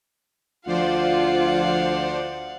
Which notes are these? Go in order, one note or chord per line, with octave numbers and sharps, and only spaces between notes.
D2 F3 F4 C5 D5 F5 F#5